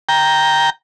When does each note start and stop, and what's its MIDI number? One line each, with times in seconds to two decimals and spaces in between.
0.09 0.70 79
0.09 0.70 82